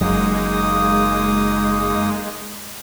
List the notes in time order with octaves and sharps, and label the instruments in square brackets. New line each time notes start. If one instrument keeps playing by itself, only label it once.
[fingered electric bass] F#1 F#2 F#3 [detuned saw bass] G#3 [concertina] A#3 D#4 D#6